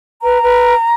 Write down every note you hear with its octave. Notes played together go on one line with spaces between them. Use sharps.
B4 A#5
B4